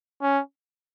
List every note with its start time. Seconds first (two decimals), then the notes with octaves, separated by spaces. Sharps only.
0.22 C#4